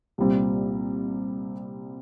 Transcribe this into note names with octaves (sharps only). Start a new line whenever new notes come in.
C2 A#2 G3 C4